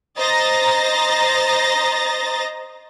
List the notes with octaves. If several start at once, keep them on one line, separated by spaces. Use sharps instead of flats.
C5 D#5 A#5 A6 A#6